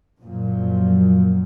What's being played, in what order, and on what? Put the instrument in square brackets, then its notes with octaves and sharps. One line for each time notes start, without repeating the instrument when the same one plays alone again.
[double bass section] F#2 A#2 F3 F#3